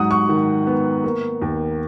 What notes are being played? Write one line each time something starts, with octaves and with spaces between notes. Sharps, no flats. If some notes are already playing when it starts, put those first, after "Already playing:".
Already playing: G#2 F#3 F#5 D#6
C#6
D#3
B3
A#3
D#2